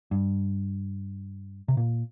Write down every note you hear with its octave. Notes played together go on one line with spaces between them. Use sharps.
G2
C3
A#2